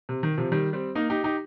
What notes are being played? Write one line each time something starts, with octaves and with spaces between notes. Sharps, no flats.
C3
D#3
C3 F3
D#3 G3
G3 C4
A#3 D#4
D#4 G4
D#4 G4